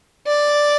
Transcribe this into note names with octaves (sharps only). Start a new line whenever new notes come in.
D5